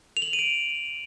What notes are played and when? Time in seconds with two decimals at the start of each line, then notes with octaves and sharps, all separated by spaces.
0.17 F7
0.22 F#7
0.28 F7
0.33 D#7
0.39 D7